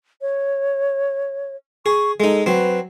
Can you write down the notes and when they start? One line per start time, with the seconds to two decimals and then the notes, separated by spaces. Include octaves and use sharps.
0.21 C#5
1.86 G#4 C#6
2.20 G#3 D#4 A4
2.46 F#3 C4 B4